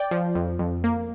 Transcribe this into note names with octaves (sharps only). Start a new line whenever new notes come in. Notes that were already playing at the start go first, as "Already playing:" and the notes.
Already playing: D5 G5
F3
F2
F2
A#3